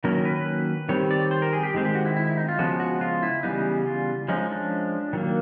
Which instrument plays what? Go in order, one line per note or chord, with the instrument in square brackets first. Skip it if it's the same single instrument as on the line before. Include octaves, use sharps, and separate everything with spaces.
[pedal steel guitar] D#3 F#3 A#3 C#4 A#4
A#4
B4
B4
D#3 G3 C4 C#5
D5
C5
A#4
G#4
G4
D#3 G#3 C4
G4
F#4
E4
E4
E4
D#4
F4
C#3 F3 G#3 B3 F#4
F#4
F4
E4
C#3 E3 G3 B3 D#4
F4
F3 G#3 C#4 D#4
D4
D#3 F#3 A#3